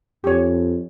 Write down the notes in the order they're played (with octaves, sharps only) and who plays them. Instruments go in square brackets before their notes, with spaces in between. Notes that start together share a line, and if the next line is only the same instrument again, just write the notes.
[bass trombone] F2 [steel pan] G4 C#5